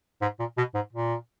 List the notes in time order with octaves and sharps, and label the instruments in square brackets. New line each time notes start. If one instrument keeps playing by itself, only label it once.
[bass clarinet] G#2
A#2
B2
G#2
A#2